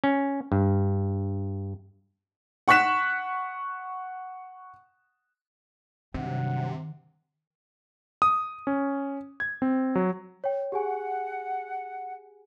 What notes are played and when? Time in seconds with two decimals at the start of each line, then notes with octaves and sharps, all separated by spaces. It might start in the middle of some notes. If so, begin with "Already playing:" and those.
0.04 C#4
0.52 G2
2.68 F#5 C#6 F#6 B6 E7
6.14 G2 C3 D#3 F#3 F#5
8.22 D#6
8.67 C#4
9.40 G#6
9.62 C4
9.95 F#3
10.44 C#5 G5
10.72 G4 G#4 F#5 G#5